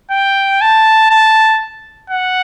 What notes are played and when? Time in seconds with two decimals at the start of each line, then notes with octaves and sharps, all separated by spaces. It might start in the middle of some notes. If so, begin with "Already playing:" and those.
0.11 G5
0.62 A5
1.11 A5
2.10 F#5